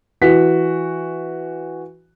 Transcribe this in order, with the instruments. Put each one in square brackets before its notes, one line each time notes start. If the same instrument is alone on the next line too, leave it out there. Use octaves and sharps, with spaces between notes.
[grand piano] E3 F#4 B6